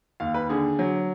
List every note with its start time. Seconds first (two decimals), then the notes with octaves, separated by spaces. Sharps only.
0.20 D#2 F5
0.34 B4
0.49 D3 G#4
0.79 F#3